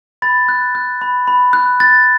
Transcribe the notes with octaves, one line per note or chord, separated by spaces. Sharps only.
B5 A6
F#6
F#6
B5
B5
F#6
F#6 A6